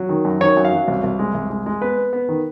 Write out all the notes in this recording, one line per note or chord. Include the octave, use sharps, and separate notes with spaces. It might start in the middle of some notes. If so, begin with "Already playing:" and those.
Already playing: F#3
D#3
F#2
D#3 C#5
F#2
F5
F#3
C2
C2
G#3
C2
G#3
G#3
B3 B4
B3
B3
D#3